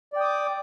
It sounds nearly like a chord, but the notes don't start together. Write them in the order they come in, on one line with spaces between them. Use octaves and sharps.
D5 G5 D#6 D6